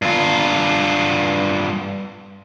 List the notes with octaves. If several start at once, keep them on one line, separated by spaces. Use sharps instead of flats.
G2 F4